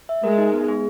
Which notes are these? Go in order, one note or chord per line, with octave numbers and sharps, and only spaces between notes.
E5
G#3 A#4
D#4
B3
G#4